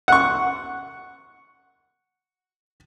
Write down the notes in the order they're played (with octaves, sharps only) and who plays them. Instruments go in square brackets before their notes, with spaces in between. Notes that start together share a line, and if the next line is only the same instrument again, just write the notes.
[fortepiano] F#5 C#6